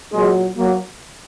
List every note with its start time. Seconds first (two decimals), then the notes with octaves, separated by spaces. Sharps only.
0.11 A#2 F#3 G#3
0.56 F#3 A#3